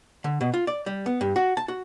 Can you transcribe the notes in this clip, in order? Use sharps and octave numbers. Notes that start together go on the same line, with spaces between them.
D3
B2
F4
D5
G3
B3
G2
F#4
A5
F#4